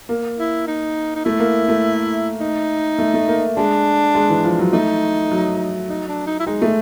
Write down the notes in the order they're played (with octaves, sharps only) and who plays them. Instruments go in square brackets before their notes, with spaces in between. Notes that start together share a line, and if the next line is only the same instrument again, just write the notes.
[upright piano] A#3
[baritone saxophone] E4
D#4
D#4
[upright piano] A3 [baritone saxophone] E4
[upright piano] A#3
A3
[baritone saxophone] D#4
[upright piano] A3
A3
A#3
[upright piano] G#3 [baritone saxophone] D4
[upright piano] G#3
E3
F3
F#3
[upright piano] A3 [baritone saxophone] D#4
[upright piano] F#3
[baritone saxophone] D#4
D4
D#4
E4
[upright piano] G#3 [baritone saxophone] D#4
[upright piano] A3